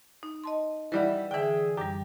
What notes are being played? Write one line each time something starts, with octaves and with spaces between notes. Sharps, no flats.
D#4
D#5 A5 C6
E3 G3 B4 D5 E5 F#5
D3 E3 G#4 E5 G5
F#2 G3 G4